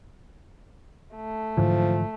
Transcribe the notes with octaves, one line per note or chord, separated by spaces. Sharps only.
A3
G#2 D3 E3 F3